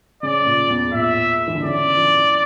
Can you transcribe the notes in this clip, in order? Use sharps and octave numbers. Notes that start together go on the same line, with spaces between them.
C#3 D5
A#2
E2
A#2 E5
E3
D3
C#3 D5
E3